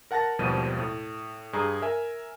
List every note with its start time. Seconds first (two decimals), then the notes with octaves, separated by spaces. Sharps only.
0.11 A#4 F#5 A5 A6 A#6
0.39 G#1 D#2 B2 F3 G3 D#7
0.79 A2
1.53 G2 G#4 A#5
1.82 A#4 E5 G#5